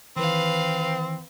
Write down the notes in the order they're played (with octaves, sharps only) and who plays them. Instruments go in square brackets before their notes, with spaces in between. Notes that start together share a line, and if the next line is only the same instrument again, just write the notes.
[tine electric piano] D#3 E3 [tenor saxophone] C4 [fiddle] B4 F5